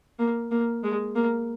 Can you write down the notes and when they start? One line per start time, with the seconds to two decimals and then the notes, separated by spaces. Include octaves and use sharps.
0.19 A#3
0.51 A#3
0.84 G#3
1.16 A#3